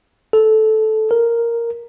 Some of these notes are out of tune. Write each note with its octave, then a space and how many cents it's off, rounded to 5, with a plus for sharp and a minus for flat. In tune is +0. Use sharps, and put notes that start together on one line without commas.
A4 -10
A#4 +0